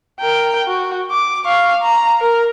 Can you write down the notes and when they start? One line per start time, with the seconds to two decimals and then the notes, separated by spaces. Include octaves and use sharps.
0.20 A#4 G5
0.67 F#4
1.11 D6
1.47 F5 C#6
1.82 A#5
2.21 A#4